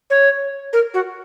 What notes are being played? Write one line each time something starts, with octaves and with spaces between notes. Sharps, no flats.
C#5
A#4
F#4